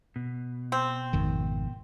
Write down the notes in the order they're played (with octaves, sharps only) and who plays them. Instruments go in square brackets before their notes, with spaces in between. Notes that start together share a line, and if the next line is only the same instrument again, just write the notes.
[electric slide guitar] B2
[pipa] C4
[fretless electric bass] G#1 F2 D#3